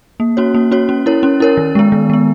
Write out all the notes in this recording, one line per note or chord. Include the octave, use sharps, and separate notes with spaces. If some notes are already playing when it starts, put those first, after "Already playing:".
A#3
C#4 F#4 C#5
A#3
C#4 F#4 C#5
C#4
E4 A#4 C#5
C#4
E4 A#4 C#5
D#3
G#3 B3
D#3
G#3 B3